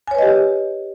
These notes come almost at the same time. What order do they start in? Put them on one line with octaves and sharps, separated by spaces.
G#5 C#5 B4 D#5 G4